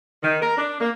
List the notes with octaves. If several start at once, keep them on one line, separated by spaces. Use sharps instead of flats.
D#3
A#4
D4
A#3